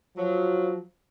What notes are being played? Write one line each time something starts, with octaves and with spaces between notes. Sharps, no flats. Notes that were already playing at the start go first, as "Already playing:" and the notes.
F3 F#3